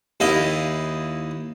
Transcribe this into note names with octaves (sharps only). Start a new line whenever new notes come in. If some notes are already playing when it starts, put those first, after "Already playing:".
D#2 E4 D#5 F5